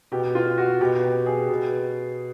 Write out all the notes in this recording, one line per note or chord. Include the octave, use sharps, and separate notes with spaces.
B2 G4
F4
F#4
B2 G4
G4
G#4
B2